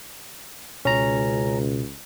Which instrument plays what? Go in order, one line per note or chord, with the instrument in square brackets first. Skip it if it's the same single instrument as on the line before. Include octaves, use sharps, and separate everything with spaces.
[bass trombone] C#2 [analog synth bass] B2 [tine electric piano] C#4 A#5